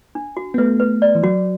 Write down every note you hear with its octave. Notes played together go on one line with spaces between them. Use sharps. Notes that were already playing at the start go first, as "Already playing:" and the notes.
D4
F#4
B3
A3 B4
B4
D5
E3
F#3 F#4